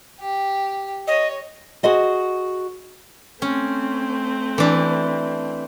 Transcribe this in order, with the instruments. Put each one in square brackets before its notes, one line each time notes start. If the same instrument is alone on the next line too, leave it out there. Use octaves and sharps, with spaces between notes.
[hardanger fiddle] G4
[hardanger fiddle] C#5 [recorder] D#5
[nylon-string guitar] F#4 G#4 C5 D#5 F#5
[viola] A3 C4 [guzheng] C#4
[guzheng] E3 D4